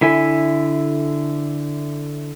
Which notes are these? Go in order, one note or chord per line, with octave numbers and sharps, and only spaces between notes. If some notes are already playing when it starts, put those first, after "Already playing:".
D3 E4 A4 E5 G#5